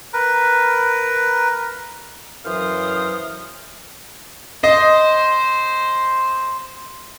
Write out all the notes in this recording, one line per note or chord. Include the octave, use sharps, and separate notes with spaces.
A#4 B4
F#2 E3 F#3 C5 F5 D#6
C5 D#5